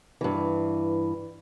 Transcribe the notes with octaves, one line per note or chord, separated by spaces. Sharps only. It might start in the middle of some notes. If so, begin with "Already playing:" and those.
G2 E3